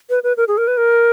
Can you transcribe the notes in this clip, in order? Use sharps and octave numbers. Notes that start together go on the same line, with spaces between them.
B4
B4
A#4
G#4
A#4
B4
A#4